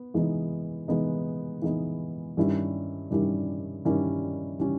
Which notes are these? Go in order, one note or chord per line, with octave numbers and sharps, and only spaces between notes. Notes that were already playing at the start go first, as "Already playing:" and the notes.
Already playing: B3
E3 G#3 B3 D#4
E3 G#3 B3 D#4
E3 G#3 B3 D#4
G2 D#3 G3 C#4 E4
G2 D#3 G3 C#4 E4
G2 D#3 G3 C#4 E4
D#3 G3 C#4 E4